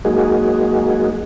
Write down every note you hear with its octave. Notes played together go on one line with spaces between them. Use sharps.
F#3 G#3 A#3 D#4 F#4 G#4